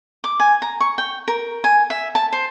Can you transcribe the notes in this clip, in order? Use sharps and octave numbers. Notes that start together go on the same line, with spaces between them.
D6
G#5
A#5
C#6
G5
A#4
G#5
E5
A5
C5